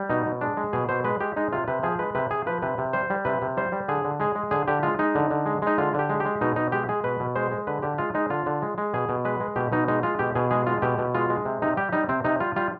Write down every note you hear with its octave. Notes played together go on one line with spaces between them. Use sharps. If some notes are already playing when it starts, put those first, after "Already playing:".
Already playing: G3
B2 D#4
B2
G#3 D4
G#3
B2 G#4
B2 C5
G#3 B4
G#3 G4
G#3 D#4
C3 F4
C3 B4
F3 G#4
G#3 B4
C3 B4
C3 G#4
F3 B4
C3 B4
C3
G3 C5
G3
C3 B4
C3
G3 C5
G3
D3 G#4
D3
G#3 G#4
G#3
D3 G#4
D3 G4
G#3 F4
G#3 D#4
D3
D3
G#3
G#3 D#4
D3 F4
D3 G4
G#3
G4
G#3
B2 D#4
B2 D#4
G#3 G4
G#3 G#4
B2 B4
B2
G#3 C5
G#3
D3 B4
D3 G4
G#3 F4
G#3 D#4
D3 F4
D3
G#3
G#3
B2 G#4
B2
G#3 B4
G#3
B2 G4
B2 D#4
G#3 D#4
G#3 F4
B2 G4
B2 G#4
G#3 G#4
G#3 F4
B2 G4
B2
G#3 F4
G#3
C3
C3 D#4
G3 G4
G3 D#4
C3 C4
C3 D#4
G3 F4
G3 F4